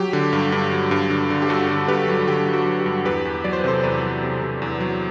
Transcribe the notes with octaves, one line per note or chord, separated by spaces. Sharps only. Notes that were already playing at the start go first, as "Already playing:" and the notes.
Already playing: F#3 G4
D3
G2
G2
F#3
G2
D3
D3
G4
G2 F#4 A4
D3
G2 G4 B4
F#3
D3 G4
F#3
F#4
F#3
G4
G2
E2 G4 B4
E2
F#3 D5
C5
B4
C3 A4 C5
E2 B4 D5
F#3
C3
C3
E2
F#3